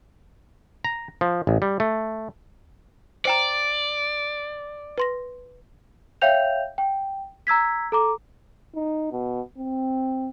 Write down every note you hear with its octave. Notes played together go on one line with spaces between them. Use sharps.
A#5
F3
A1
G3
A3
C5 D5 G5 A#5
B4 C6 A#6
C#5 E5 F5 G5 G6 F7
G5
A#5 E6 G#6 B6
A4 A#5 D6
D#4
B2
C4